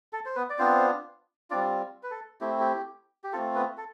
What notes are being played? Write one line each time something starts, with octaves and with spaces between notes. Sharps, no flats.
A4
C5
B3 B4
D5
B3 C4 D4 F4 C5
G3 C4 D4 F4 D5
B4
A4
A3 C4 E4 G4
G4
G4
A3 C4 F4 A4
B3 B4
A4